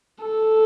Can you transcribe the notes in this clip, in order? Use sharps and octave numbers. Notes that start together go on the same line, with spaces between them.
A4